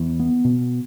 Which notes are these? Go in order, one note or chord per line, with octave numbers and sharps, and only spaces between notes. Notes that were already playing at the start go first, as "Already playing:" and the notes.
Already playing: E2
B3
B2